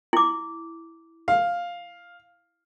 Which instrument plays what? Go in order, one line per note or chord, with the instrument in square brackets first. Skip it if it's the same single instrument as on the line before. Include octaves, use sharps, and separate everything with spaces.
[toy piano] E4 D6
[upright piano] F5